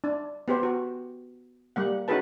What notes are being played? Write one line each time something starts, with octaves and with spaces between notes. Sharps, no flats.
D4
B3 G4 C5
F#4
G3 A#3 F#5
C#4 D#4 F#4 G#4 B4 A5